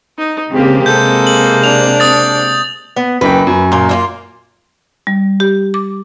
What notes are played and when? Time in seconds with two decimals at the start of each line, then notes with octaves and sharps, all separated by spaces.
0.18 D#4
0.52 C#3 G#3 A#3 C4 G4
0.86 C3 A4 G6
1.27 F#7
1.64 D4 F7
2.00 D#6 A6
2.96 B3
3.21 F#1 F#2 B4 G5
3.47 F#2
3.72 A#2 A#3
3.89 A#3 E4 F4
5.07 G3
5.40 G4
5.74 D6